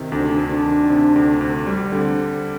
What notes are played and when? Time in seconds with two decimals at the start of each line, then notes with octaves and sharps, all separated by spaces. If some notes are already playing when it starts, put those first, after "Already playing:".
Already playing: C3 D#3
0.12 D2 D4
0.30 D4
0.38 D2
0.47 D4
0.63 D#3
0.90 C3
1.16 D2
1.41 D2
1.67 G3
1.92 D3 C4